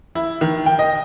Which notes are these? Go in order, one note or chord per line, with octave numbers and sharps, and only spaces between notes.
E4
D#3
G5
D#5